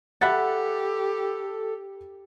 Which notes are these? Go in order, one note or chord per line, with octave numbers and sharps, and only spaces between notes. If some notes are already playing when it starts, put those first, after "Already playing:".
G4 A4 E5 F#5 B5 F#6 A6